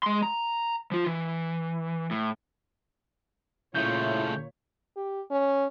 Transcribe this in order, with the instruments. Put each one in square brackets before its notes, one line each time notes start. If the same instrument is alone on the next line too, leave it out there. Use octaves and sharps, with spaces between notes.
[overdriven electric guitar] G#3 C6
A#5
F3 F4
E3
A2
[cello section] A#2 C#5 [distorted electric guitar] C#3 A3 [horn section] E4 F4 [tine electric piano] G6
[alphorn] G4
C#4